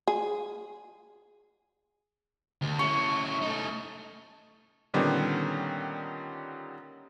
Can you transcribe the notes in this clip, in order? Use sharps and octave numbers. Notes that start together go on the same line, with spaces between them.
G#4
D2
C#4 E4 C#6
A3 D#4
A#2 D3 D#3 G3 B3 C#4